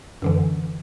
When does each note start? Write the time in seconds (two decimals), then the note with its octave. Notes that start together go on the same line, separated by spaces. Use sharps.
0.22 F#2 D3 E3